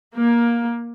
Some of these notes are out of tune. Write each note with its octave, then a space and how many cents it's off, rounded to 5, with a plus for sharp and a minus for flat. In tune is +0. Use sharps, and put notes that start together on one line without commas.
A#3 +15